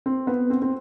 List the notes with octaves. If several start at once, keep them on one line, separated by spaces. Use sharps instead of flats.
C4
B3
C4
C4